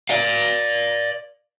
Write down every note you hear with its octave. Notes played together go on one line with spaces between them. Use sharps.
D5 F5